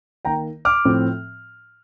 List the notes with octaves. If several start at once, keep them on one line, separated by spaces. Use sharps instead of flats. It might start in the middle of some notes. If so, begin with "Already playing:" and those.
D#3 A#3 G5 A#5
D6 F6
A2 F3 A3 C4